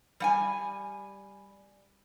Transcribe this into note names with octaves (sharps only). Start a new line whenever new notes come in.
G3 F#5 G#5